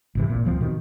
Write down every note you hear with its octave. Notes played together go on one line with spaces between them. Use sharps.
G#1 C3 E3
A#2
D1 F3 G#3 C4
B2 D#3